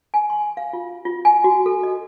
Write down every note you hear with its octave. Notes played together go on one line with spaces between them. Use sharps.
G#5
C6
F5
F4
F4
G#5
F#4
A4
D#5